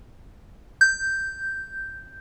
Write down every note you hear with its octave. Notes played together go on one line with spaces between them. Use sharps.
G6